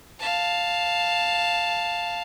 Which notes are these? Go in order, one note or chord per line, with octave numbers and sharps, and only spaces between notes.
F5 A5